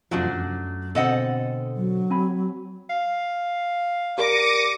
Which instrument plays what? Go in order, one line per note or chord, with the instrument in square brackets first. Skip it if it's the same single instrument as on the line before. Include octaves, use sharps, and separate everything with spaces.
[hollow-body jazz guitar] F2 C3 F3 [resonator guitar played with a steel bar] F#3 A3 D4
[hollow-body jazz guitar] F#2
[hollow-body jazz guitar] B2 D3 C4 [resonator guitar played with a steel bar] A4 D#5 F#5
[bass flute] F#3
[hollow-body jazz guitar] C4 G#5 B5
[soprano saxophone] F5
[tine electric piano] G4 A#4 D5 [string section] D6 [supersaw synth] A#6 C#7 D#7